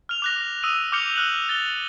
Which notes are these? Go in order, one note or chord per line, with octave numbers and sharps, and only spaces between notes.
F6 F7 G7
D6 F#6 A#6
D#6 E6 D#7 F7
D6 F6 G6 C#7 F7 G7
F6 F#6 F#7
A6 G7